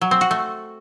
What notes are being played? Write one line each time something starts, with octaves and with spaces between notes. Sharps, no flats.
F#3
C4
F#4
A3